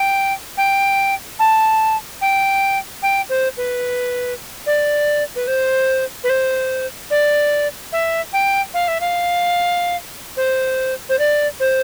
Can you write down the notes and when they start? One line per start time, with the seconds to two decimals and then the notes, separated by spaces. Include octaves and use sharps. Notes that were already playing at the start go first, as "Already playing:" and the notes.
Already playing: G5
0.57 G5
1.39 A5
2.21 G5
3.02 G5
3.29 C5
3.57 B4
4.66 D5
5.36 B4
5.47 C5
6.24 B4
6.29 C5
7.10 D5
7.92 E5
8.33 G5
8.74 F5
8.88 E5
9.01 F5
10.37 C5
11.09 C5
11.19 D5
11.60 C5